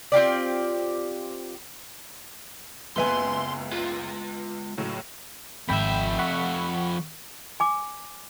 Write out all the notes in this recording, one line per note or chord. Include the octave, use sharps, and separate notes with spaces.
C4 F4 G4 D5
F#1 C#2 B3 B4 E5 G#5 C6
G#3 F4
C#2 A2 F#3
G#1 F2 E5 G5 B5
F#5 B5 C#6
G#5 D6